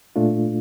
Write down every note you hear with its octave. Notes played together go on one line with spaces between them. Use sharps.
A#2 A3 D4 F4